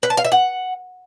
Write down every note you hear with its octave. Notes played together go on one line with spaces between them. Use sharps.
B4
A5
F5
E5
F#5